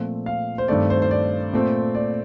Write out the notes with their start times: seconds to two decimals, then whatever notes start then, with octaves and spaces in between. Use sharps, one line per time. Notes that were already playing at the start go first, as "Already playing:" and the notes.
Already playing: A#2 F3 A3 C4
0.26 F5
0.58 C5
0.68 G2 D#3 A3 C4 D5
0.90 C5
1.02 C5
1.11 D5
1.53 A#2 A3 C4
1.95 D5